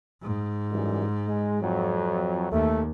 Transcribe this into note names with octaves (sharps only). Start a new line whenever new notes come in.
G#2
F#2 E3 G3
G#3
F2 F#3
D#2 A3